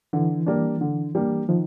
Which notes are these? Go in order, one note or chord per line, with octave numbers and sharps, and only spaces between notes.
D3 E3
G3 A#3 D4
D3
G3 A#3 D4
D#3 F3